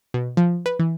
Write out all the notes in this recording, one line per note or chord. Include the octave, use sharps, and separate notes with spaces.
B2
F3
B4
E3